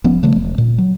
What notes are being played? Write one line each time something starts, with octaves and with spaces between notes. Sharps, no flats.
E1 F3 B3 C#4
C#3 F3 G3 A3
E1
A#2
F#3